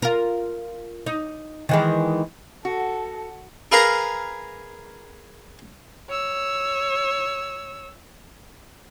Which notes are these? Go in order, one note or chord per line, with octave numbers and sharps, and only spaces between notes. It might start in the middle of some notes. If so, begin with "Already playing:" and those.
F4 A#4
D#4
D#3 E3 G#3
F#4 A4
G#4 A#4 B4 F5 A#5
C#5 E6